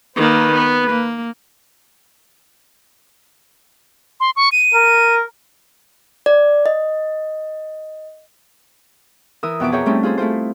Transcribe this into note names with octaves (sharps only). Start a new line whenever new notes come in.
D#3 A#3 B4
B3
A#3
C6
C#6
D#7
A#4
D5
D#5
E3 A#4 D#6 E6
F2 B2 E5 D6
G#4 A#4 C#5 E5 G5 A#5
G3 A3 C4 C#4 D#4 A4
F4 G#4 A4 C5
A3 E4 F4 C5